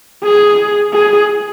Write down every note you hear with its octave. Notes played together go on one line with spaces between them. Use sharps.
G#4
G#4